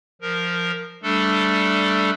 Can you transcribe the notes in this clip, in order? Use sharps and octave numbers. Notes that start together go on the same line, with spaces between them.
F3 A#4
G3 A3 D4 A4